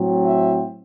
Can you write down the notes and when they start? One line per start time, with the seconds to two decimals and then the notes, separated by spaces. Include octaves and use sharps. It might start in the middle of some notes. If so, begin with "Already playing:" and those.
Already playing: A2 F#3 C4
0.26 E5